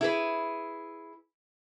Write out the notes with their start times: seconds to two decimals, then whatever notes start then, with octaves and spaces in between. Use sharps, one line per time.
0.01 E4 G#4 B4